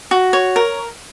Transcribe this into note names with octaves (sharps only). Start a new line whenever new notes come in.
F#4
C#5
A#4